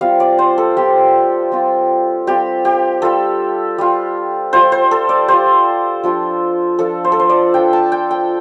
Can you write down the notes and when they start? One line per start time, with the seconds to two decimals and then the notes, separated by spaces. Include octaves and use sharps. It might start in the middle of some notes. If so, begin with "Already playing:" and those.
0.01 G3 C4 F4 F5
0.20 D5
0.39 C5
0.58 A4
0.77 G3 C4 F4 G4
1.52 G3 C4 F4
2.27 G3 C4 F4 G4
2.65 G4
3.02 G3 F4 A4
3.78 G3 F4
4.53 G3 F4 C5
4.72 C5
4.91 A4
5.09 D5
5.28 G3 F4 C5
6.04 F3 D4 F4
6.79 F3 D4 F4 A4
7.04 C5
7.12 A4
7.20 C5
7.30 D5
7.54 F3 D4 F4 G5
7.73 A5
7.92 G5
8.11 G5